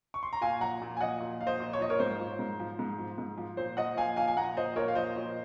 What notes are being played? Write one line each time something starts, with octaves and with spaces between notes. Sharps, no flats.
C#6
C6
A#5
A#2 F5 G#5
F3 F#5 A#5
A#2
G#5
F3 D#5 F#5
A#2
F3 F5
C5 D#5
A#2
C#5
F3 D#5
A#4 C#5
G#2 C5
F3
G#2
F3
G#2
F3
G#2
F3
A#2 C5
F3 D#5 F#5
A#2 F5 G#5
F3 F5 G#5
G#5
A#2 F#5 A#5
F3 C5 D#5
A#2 A#4 C#5
F5
F3 C5 D#5
A#2